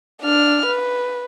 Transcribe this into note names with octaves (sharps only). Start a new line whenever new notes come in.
D4 F6
B4